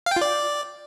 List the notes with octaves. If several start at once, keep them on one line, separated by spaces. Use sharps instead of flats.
F5
G5
F4
D5